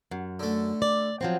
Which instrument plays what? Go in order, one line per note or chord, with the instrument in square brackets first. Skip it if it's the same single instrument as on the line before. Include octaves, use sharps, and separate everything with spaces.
[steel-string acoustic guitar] F#2
[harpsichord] D3 A3
[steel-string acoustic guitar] D5
F3 F#3 C4